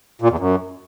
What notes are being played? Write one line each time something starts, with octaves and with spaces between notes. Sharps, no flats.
A#2
E2
F#2